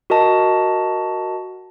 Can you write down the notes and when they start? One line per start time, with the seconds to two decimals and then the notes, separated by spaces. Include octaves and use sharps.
0.10 F#4 A#4 D#5 A5